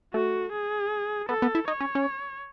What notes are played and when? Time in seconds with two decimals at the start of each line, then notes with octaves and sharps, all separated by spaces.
0.14 A3 F#4
0.52 G#4
1.29 B3 A4
1.42 B3
1.55 E4
1.68 D#4 C#5
1.80 C#4
1.95 C#4